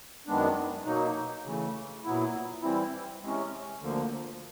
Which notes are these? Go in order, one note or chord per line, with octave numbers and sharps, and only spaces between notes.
F#2 D#3 G#3 B3 D4
B2 F#3 A#3 D#4
C#3 E3 A3
A#2 F#3 B3 E4
E3 G3 C4 E4
C3 E3 G#3 C#4
D2 D3 F3 A#3